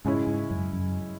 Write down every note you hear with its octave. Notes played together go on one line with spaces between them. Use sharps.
G#2 C#3 G#3 C#4 E4
G#2
F#2
F#2